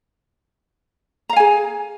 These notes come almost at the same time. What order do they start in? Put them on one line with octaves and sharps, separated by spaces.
A#5 F5 G#5 G#4